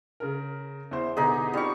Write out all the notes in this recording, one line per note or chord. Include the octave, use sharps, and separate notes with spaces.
C#3 A#4
E2 E4 C5
B2 D3 B3 D#4 G4 G#4
G3 C4 D#4 F4 C#6